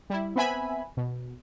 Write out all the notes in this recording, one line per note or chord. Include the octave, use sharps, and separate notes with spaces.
G3 E4
B3 C4 B4 E5 G#5 B5
B2